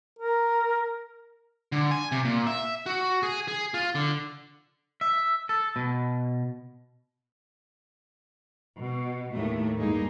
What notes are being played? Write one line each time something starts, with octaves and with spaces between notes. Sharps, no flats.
A#4
D3
G#5
C3
A#2
E5
F#4
G#4
G#4
F4
D3
E5
A4
B2
B2
D#2 A2 A3
G2 G#3 A#3 D#4 G#4